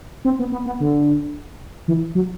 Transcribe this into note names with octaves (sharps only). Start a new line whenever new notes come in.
C4
B3
B3
B3
D3
E3
F#3